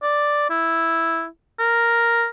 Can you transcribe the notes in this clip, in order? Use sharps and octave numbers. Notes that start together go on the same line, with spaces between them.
D5
E4
A#4